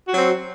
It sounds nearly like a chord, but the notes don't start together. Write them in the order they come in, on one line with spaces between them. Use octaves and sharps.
F#4 F#3 C4